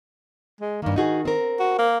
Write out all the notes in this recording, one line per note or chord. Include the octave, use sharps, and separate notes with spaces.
G#3
G2 D#3 A#3
D#3 D#4 F#4 G#4
C4 A#4
F#4
A#3